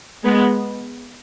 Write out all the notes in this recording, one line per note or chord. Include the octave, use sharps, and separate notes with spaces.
G#3 B3